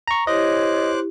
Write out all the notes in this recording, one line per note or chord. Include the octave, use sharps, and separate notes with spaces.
A#5 C#6
E4 G4 C5 C#5 D#5 D6 F#6